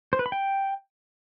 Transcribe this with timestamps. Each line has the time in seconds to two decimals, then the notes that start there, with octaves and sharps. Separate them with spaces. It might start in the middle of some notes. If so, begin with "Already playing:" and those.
0.13 C5
0.19 B4
0.26 B5
0.32 G5